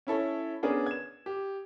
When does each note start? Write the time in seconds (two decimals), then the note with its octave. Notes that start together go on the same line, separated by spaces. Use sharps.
0.07 C#4 E4 A4 C#5
0.63 B3 C#4 D4 G#4 A#4
0.86 G#6 E7
1.26 G4